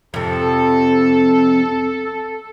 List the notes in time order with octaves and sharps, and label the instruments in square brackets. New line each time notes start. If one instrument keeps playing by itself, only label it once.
[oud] F2 C3 [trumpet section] A4